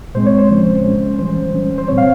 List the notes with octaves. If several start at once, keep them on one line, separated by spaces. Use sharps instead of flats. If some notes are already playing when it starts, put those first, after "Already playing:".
A#2 G#3 C4 C5
C#5
C5
C#3 F3 G#3 C#4
A#2 G#3 C#4
E3 G3 C#4 C5
E3 G3 C#4
C5
A#2 G3 C4 C#5
F5